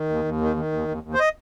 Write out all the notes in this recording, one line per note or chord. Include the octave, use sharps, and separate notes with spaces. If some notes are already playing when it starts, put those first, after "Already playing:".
Already playing: D#3
D#2
D#2
D#3
D#3
D#2
D#2
D#2
C5
D#5